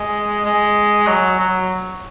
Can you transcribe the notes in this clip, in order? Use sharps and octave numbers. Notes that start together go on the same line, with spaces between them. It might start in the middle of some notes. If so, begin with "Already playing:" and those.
Already playing: G#3
G#3
F#3
F#3